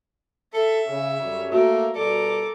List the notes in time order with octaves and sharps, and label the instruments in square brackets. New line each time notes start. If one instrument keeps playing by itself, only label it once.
[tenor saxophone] A4 [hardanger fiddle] E5
[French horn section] C#3 [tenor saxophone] C#4
[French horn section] F#2 D3 G3
[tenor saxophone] A3 [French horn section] A#3 [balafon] F#4 [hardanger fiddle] A#4
[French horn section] B2 G3 D5 [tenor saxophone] A4 [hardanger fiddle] A#4 D6